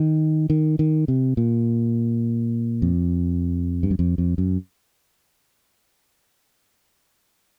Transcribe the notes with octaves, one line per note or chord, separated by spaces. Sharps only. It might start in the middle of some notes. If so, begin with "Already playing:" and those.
Already playing: D#3
D#3
D#3
C3
A#2
F2
G2
F#2
F2
F2
F#2